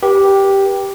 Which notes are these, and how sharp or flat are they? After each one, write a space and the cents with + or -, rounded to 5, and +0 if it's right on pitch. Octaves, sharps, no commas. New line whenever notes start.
G4 +0 B4 -40